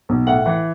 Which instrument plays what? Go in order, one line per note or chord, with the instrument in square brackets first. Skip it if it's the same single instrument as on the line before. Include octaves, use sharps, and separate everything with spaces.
[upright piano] B1
A2 F#5
E3